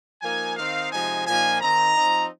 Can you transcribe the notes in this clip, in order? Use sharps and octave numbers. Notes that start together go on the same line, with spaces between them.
F3 A#3 D#4 G#5
D#3 C4 D#4 F5
C3 F3 G#3 D#4 G#5
A#2 F3 A#3 D#4 G#5
D#3 C4 D#4 A#5
F3 C4 D#4